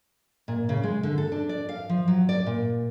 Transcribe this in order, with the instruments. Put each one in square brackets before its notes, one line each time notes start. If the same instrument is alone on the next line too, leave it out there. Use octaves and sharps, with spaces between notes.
[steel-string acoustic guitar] A#2
C#3
G#3
D3
A4
D4
D5
F5
F3
F#3
D5
A#2